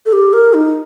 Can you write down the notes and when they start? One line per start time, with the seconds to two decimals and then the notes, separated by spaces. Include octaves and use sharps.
0.06 A4
0.13 G4
0.33 A#4
0.53 D#4